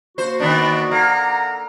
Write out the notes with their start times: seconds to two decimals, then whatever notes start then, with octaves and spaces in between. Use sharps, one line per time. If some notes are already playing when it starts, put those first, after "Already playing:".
0.18 A#3 F#4 C5
0.40 D#3 B3 D4
0.91 A#3 A4 F#5 A#5